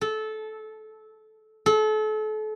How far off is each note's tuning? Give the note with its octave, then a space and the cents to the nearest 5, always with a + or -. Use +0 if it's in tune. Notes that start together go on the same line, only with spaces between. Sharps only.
A4 -20
A4 -35